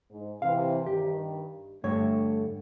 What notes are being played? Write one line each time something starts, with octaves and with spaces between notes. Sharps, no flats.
G#2
C3 E3 F5
G2 D#3 G4
G2 D3 A3 C#5